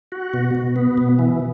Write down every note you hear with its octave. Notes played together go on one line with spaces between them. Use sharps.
F#4
B2
B2
B3
B2
E3